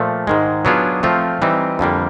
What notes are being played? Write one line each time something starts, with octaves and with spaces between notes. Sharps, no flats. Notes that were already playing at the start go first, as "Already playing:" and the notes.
Already playing: A#2 F3 A3
G#2 D#3 G#3
F#3 B3 D4 F4 G#4
F3 A3 C4 F4
E3 G3 C4 D#4
F2 D3 G3 A#3